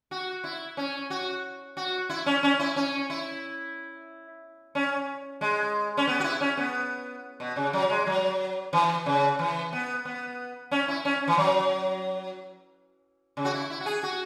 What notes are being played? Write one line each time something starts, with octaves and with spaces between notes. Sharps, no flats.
F#4
E4
C#4
F#4
F#4
E4
C#4
C#4
E4
C#4
E4
C#4
G#3
C#4
B3
F#4
E4
C#4
B3
B2
C#3
F#3
G#3
F#3
E3
C#3
E3
B3
B3
C#4
E4
C#4
E3
F#3
C#3
F#4
E4
E4
F#4
G#4
F#4